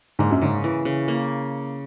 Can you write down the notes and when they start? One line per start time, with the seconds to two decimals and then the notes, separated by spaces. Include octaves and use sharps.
0.19 G#2 A#3
0.31 F#2
0.42 G#2 C#3
0.64 E3
0.85 C#3
1.08 A#3